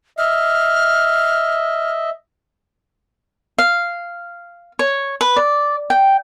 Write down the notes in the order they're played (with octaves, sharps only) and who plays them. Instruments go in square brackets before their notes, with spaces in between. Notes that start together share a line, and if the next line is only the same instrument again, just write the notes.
[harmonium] D#5 E5 [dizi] F6
[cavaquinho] F5
C#5
B4
D5
G5